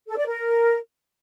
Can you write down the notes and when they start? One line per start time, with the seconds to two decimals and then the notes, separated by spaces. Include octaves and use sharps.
0.07 A4
0.17 D5
0.27 A#4